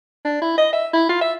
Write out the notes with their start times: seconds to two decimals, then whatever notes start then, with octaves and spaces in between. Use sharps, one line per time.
0.25 D4
0.42 E4
0.58 D#5
0.73 E5
0.93 E4
1.09 F4
1.21 E5